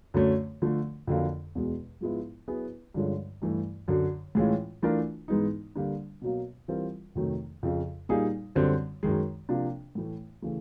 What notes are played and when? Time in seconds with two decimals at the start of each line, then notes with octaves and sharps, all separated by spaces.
0.14 F#2 D3 F#3 A3 C#4
0.62 D3 F3 A3
1.07 F2 D3 F#3 A#3
1.55 E2 B2 G#3
2.01 G#2 F3 G#3 B3 E4
2.48 F#3 B3 E4 G#4 B4
2.94 G2 D3 F3 G#3 C#4
3.42 G2 E3 A3
3.88 F#2 D3 F#3
4.35 A2 E3 G#3 C#4 F4
4.82 E3 A3 D4 F4 A#4
5.28 G#2 E3 G#3 B3 D#4
5.75 D3 G3 A#3 D4
6.22 B2 F#3 A#3
6.68 E3 G3 C4 F4 A#4
7.15 F2 C3 D#3 F#3 A3
7.63 F2 C#3 F3
8.09 A#2 G3 A#3 D#4 G#4
8.55 F#2 D3 G3 C4
9.03 F#2 D#3 G#3
9.49 C3 F3 A#3 D4
9.95 A2 E3 A3
10.42 C#3 E3 A3